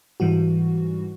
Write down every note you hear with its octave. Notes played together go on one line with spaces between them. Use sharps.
G#2 E3 G3 F#4